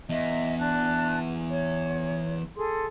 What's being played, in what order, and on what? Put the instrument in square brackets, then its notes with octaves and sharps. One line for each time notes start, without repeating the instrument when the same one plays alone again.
[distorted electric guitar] E2 [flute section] D#5 E5
[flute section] D4 A5 F#6
C#5
G#4 A4 C6